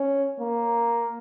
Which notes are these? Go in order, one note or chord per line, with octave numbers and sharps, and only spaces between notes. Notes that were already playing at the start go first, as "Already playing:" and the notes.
Already playing: C#4
A#3